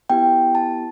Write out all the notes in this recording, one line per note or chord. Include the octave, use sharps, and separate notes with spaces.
B3 E4 G4 G5
A5